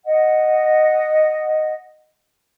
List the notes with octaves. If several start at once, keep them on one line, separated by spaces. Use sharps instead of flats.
D#5 F#5